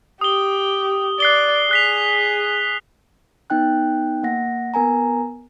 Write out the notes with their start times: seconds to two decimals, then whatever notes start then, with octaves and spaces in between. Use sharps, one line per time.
0.21 G4 D#6 G7
1.20 D5 F#6 C7 G7
1.71 G#4 F#6 B6 F7
3.50 B3 D#4 G5 F#6
4.23 A#3 F#5 A#6
4.74 B3 A#4 G#5 A#5